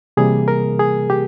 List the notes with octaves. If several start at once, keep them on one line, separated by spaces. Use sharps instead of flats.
C3 E3 G3 A#3 G#4
A#4
G#4
G4